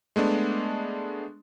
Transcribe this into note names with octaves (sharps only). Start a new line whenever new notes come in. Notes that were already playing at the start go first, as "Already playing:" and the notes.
G#3 A3 B3 D4